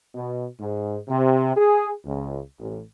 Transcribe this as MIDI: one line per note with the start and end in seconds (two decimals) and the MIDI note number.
0.14 0.45 47
0.59 0.97 44
1.08 1.52 48
1.56 1.90 68
2.04 2.39 37
2.60 2.79 33